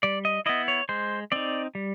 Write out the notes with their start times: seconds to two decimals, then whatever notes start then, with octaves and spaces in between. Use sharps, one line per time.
0.03 G3 D5
0.25 D#5
0.46 B3 E4 D#5
0.68 C#5
0.89 G#3 C5
1.32 C4 D#4 D5
1.75 G3